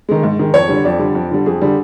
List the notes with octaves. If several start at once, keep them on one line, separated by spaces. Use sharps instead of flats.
D#3 G#3
G#2
D#3 G#3
F2 C#5
D3 G3
F2 D5
D3 G3
F2
D3 G3
F2 G#4
D3 G3